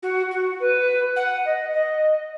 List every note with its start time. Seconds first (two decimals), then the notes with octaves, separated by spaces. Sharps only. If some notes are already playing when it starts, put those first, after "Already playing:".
0.03 F#4
0.31 F#4
0.60 B4
1.16 F#5
1.45 D#5
1.73 D#5